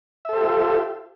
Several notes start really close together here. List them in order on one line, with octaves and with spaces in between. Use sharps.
E5 A4 C5 G4 F4